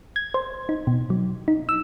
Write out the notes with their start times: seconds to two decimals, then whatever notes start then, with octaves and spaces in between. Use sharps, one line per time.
0.16 G#6
0.34 C5
0.69 D#4
0.87 B2
1.10 F#3
1.48 D#4
1.69 E6